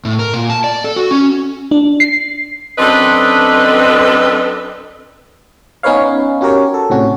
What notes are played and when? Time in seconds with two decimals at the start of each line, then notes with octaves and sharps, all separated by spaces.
0.05 A2
0.19 A#4
0.34 A#2
0.50 A5
0.64 D5
0.84 A4
0.96 F#4
1.11 C#4
1.71 D4
2.00 C7
2.78 F#2 C4 D4 A4 B4 D#5
5.83 B3 C#4 D#4 B4 C#5 F5
6.41 C#4 F#4 G4 A#4 C#5
6.74 A4
6.90 A2 C3 C#4 F#4